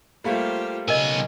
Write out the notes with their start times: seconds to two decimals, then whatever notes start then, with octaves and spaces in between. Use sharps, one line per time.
0.24 G3 A3 A#3 F4 G4 C5
0.88 B1 C#3 A#4 D#5 G#5